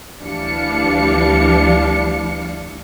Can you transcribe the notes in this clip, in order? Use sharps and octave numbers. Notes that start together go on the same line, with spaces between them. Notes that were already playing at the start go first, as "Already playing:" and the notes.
D2 E3 G3 D4 F5 C#7